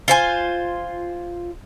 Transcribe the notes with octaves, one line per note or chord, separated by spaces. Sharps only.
F4 C5 G#5